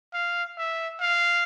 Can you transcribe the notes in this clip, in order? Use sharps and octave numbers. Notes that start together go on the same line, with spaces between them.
F5
E5
F5